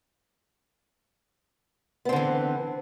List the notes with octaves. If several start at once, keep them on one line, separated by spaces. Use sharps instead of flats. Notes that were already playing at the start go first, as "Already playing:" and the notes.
D3 E3 B3 C4